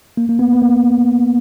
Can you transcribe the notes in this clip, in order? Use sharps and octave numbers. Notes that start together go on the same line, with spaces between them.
A#3
A#3
B3
B3
A#3